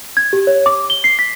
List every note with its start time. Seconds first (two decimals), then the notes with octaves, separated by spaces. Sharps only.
0.17 G#6
0.33 G4
0.47 C#5
0.66 D6
0.90 G7
1.04 C7
1.19 B6